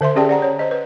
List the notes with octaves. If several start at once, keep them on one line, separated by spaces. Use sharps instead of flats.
D3 C5 E5 C6
C#4 G4 G#4 D5 G5 A5
D5 F#5 A#5
C#5
C5 D#5
B4